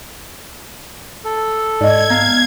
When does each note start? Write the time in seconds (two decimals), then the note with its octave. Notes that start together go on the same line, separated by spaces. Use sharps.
1.24 A4
1.81 G#2 D5 D#5 G#6
2.10 B3 F5